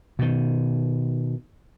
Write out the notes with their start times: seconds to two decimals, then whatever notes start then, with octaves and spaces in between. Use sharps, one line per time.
0.19 B2 D#3